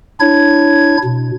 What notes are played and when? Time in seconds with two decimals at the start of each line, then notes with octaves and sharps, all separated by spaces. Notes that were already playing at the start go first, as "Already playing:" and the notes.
0.20 D4 E4 C#5 G#6
1.04 B2